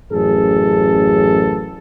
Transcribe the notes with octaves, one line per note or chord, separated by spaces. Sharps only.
A1 F#2 G#4 A4